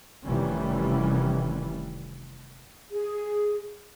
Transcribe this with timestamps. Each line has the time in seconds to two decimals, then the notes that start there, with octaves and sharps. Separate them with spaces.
0.24 F1 D#3 E3 G3 C#4
2.91 G#4